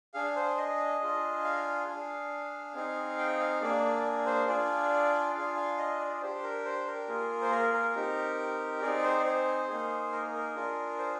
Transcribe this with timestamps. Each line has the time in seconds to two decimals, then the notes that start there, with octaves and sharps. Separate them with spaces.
0.14 D4 G#4 F5
0.36 C5
0.57 D#5
1.01 D4 F4 G#4
1.44 F5
1.88 D4 G#4
2.74 C4 D#4 G#4
3.18 G5
3.40 F5
3.61 A#3 D4 G#4 D5
4.26 C5
4.48 D4 F4 G#4 D5
5.35 D4 F4 G#4 F5
5.56 F5
5.78 D#5
6.00 D5
6.17 D5
6.21 D4 G4 C5
6.43 A#4
6.65 C5
6.87 A#4
7.08 A#3 F4 G#4
7.41 C5
7.51 A#4
7.73 A#4
7.95 C4 D#4 G4
8.82 C4 D#4 G#4 D5
9.03 C5
9.20 D5
9.25 C5
9.69 A#3 D#4 G#4
10.12 A#4
10.34 A#4
10.56 D4 F4 G#4
10.99 C5